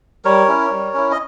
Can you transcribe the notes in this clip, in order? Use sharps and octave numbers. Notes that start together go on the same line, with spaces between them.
G3 A#4 C#5
C#4 E4
G3
C#4 E4
D#5